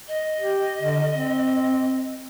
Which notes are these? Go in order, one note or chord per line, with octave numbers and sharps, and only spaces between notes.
D#5
G4
D3
C4